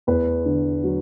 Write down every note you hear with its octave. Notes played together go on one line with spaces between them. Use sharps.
E2 B4
D3
F#3